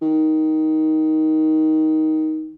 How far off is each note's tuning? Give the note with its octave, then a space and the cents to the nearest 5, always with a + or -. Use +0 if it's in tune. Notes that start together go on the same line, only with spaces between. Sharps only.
D#3 +10